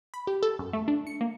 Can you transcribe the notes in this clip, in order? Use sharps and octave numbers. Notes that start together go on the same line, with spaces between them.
B5
G4
A4
F#2
A3
D4
C#7
A#3